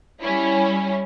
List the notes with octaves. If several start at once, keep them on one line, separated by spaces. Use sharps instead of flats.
G3 C#4 E4